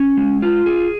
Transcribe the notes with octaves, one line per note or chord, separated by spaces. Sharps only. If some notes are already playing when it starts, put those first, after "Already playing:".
Already playing: C#4
G#3
F4
G#4